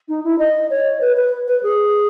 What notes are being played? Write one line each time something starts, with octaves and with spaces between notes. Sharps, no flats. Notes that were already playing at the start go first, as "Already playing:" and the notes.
D#4
E4
D#5
C#5
B4
B4
B4
G#4